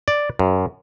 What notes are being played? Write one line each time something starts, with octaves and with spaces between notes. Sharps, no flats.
D5
F#2